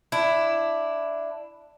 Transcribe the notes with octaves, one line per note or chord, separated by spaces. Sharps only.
D4 E4